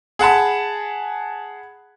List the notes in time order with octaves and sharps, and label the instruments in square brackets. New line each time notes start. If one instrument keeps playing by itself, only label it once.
[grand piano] G#4 F#5 A5 B5